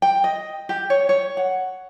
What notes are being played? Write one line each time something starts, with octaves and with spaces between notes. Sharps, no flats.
G5
D#5
G4
C#5
C#5
F#5